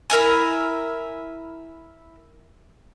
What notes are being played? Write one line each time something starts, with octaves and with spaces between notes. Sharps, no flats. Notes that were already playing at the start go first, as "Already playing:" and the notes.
E4 A#4 E5 G#5